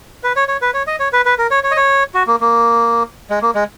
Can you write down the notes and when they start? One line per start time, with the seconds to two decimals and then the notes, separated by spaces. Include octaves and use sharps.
0.24 B4
0.36 C#5
0.48 C#5
0.62 B4
0.74 C#5
0.87 D#5
1.00 C#5
1.13 B4
1.25 B4
1.38 A#4
1.51 C#5
1.63 C#5
1.71 D#5
1.77 C#5
2.14 F#4
2.27 A#3
2.41 A#3
3.30 G#3
3.42 A#3
3.55 G#3